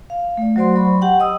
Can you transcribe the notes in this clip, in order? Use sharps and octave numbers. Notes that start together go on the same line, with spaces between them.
F5
A3 D5
F#3 F#4 C5 D5 C6
F#3 B5 C#6
G4 F#5 G5
D#5 D#6 E6